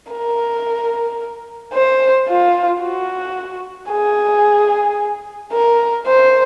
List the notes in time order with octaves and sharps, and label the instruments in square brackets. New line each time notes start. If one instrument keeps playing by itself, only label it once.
[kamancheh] A#4
C5
F4
F#4
G#4
A#4
C5